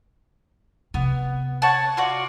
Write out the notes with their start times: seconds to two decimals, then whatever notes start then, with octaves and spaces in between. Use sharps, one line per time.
0.94 C3 B3
1.62 C#5 F#5 A5
1.97 F4 F#4 D5